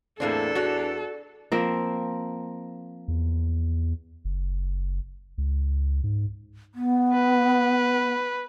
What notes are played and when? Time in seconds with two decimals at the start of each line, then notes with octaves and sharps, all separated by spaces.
0.20 E2 A2 A#3 C4 D4 A4 D5
0.55 F#4 C#5
1.52 F3 A#3 C4
3.08 E2
4.25 F#1
5.38 C#2
6.03 G#2
6.74 B3
7.13 B4